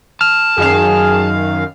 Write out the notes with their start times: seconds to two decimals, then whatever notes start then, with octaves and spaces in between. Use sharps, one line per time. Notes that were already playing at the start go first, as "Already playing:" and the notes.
0.21 A5 F6
0.58 F#2 D#3 G#4 F5